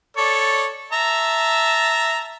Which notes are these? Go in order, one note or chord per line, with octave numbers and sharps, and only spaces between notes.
A4 C#5 D5
E5 A5 A#5